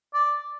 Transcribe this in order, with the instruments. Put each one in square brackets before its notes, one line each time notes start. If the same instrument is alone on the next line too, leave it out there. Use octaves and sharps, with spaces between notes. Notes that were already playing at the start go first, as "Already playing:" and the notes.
[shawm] D5